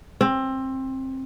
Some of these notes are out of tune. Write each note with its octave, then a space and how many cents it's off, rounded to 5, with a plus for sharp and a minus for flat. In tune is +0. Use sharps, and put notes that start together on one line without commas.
C4 +20